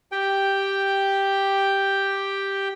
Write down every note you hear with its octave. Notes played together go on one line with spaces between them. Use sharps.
G4 G5